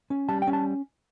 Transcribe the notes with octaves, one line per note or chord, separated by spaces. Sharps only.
C#4
G3 A5
G5
C#4
A5